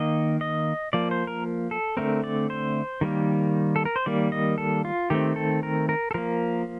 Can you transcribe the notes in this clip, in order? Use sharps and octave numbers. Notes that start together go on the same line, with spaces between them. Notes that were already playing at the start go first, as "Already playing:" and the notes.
Already playing: D#3 A#3 D#5
D#5
F3 A#3 D5
C5
A#4
A4
D3 A3 C4 A#4
D5
C5
D#3 G3 A#3
A4
A#4
C5
D#3 G3 A#3 D5
D#5
A4
F4
D#3 A3 C4 G4
A4
A#4
A#4
A4
F3 A#3 A#4